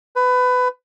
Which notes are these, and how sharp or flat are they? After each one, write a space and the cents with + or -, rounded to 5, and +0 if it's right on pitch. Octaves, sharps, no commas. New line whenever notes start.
B4 +20